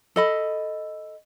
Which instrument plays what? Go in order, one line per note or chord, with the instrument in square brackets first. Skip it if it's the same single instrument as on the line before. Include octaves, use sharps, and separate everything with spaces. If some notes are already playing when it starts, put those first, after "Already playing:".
[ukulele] A4 D#5 B5